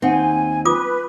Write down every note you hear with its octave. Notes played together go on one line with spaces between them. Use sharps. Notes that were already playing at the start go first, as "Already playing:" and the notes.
D#2 C4 D#4 F#5 G#5
F4 B4 D6 D#6